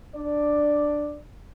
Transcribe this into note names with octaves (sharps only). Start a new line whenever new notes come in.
D4 D5